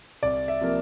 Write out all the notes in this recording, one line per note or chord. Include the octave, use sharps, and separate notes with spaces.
C2 D5
E5
C3 F3 A#3